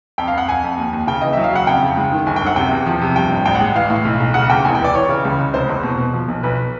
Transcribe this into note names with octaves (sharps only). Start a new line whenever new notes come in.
F2 G5
F5
F2 F#5
F2 G#5
F2
D#2
D#2
C#3 G5
E3 D#5
F#3 E5
F5
C#3 F#5
F2 G5
C#3
G#3
D#3
G1 G#5
G5
F#2 F#5
C3 G5
E2
F3
C3
G2 G5
A1
A1 G5
F#5
G#3
E3 F5
A2
B1
B1
C#3 F#5
E2 G5
F1 G#5
G5
E3 D5
E3 C#5
C#3
C#2
C#2
F1 C5
E2
B2
B2
F3
B1
B1 B4